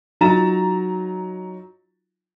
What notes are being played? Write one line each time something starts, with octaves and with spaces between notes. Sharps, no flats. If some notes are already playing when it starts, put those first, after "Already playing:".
F#3 D#4 F4 A#5 A6 E7